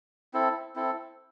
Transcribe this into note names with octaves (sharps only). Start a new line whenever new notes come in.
C4 E4 A4
C4 E4 A4